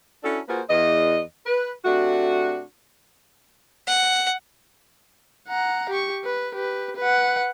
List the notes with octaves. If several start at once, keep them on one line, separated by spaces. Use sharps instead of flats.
C#4 D4 E4 F#4 A4
A#3 F4 F#4 G#4 B4 C5
E2 D#5
B4
C3 A3 D4 F#4
F#5
F#5 A#5
G4 C#6
B4
G4 B4
B4 F#5